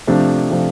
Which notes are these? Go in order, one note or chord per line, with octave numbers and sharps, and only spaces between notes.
C3 F3 A3 D4
C3 F3 A3